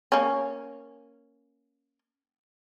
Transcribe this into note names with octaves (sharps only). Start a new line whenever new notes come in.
A#3 C#4